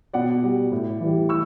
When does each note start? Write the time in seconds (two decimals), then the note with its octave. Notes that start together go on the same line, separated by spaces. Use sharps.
0.14 B2 D5 F#5
0.43 G3
0.72 A2
1.01 E3 G3
1.29 C#6 E6